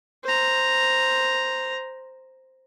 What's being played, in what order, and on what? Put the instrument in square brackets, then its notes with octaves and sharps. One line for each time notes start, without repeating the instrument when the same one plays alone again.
[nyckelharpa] C5 A#5